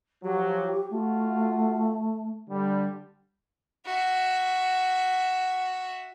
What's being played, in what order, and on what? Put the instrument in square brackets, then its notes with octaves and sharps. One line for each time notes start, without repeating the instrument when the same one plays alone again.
[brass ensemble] F3 F#3 [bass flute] G4
[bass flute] A3 [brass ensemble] F4 F#4
[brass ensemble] D3 G3
[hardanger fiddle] F#4 E5